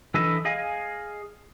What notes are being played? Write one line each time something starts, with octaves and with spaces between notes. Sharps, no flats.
E3 D4 A4 B4 D#5 E5
G#4 D#5 F5 G#5